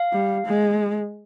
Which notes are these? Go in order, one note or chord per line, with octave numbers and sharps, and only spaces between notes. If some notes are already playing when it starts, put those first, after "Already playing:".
Already playing: F5
G3
G#3